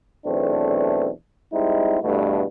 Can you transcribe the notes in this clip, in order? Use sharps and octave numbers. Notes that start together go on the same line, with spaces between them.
B1 E2 A3 C4 D4
G3 G#3 C4 D#4 E4
E2 G2 B2 A3